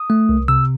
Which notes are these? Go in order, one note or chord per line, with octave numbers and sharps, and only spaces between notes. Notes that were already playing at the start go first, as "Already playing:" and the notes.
Already playing: D#6
A3
C2
C3 E6